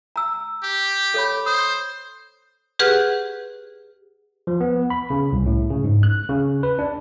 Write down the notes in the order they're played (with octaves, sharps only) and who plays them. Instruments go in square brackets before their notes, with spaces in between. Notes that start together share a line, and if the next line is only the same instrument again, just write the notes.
[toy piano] A#5 E6
[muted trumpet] G4
[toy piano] A4 C#5 B5
[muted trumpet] C5 [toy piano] D#6
[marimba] G4 G#4 B4 F#5 F6 F#6
[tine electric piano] F3
B3
B5
C#3
C2
A2
C#3
G#2
F#6
C#3
B4
D4